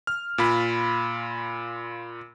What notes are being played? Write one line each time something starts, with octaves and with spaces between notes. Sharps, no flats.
F6
A#2 F4 B5